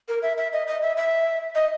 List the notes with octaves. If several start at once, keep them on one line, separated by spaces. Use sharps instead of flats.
A#4
E5
E5
D#5
D#5
E5
E5
D#5